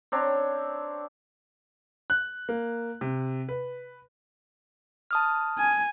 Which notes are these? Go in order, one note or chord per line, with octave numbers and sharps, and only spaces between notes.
C4 D4 C#5 A#5
F#6
A#3
C3
B4
A5 D#6 F6
G#5